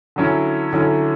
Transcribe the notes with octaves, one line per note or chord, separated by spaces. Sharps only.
D3 F#3 C#4 E4
D3 F#3 C#4 E4